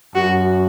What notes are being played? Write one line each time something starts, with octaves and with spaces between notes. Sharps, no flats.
F#2 F#4